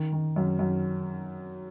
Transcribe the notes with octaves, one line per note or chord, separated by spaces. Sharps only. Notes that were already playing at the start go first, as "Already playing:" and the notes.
Already playing: D#3
D#3
F#2
F#2